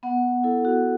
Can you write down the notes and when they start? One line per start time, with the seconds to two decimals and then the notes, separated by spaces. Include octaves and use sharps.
0.03 B3 F#5
0.44 E4 A4
0.65 F#4